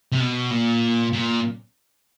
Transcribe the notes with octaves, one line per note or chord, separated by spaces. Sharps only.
C3
B2
A#2
A#2